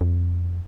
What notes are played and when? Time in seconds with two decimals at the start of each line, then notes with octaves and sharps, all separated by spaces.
0.01 F2